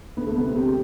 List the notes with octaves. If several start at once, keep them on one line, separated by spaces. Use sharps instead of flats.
D2 B3
A3
C3 G3 B3
C4
D2 G4
G4